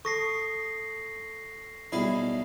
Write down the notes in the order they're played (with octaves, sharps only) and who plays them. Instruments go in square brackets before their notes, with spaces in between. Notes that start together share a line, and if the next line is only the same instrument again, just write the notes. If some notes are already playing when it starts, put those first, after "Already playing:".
[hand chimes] A4 D#6 [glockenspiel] C#6 A#6 C7
[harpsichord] B1 G3 G#4 [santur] E4